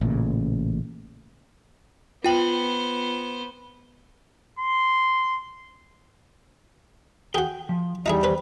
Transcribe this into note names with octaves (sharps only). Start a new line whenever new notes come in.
A1 A#2 C#3
B3 F4 C5 G5 F#7
C6
F#4 G#4 G5
F3
E2 G3 D#4 E4 G#4
B4 C5